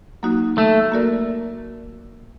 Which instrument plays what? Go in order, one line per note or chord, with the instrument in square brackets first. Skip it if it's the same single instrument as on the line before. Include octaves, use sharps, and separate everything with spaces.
[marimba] F#3 A#3 D#4 F#4
[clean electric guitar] A3
[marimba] A#3 F#4 A#4 D5